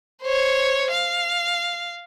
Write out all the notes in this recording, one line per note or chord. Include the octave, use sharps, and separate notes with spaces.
C5 C#5
F5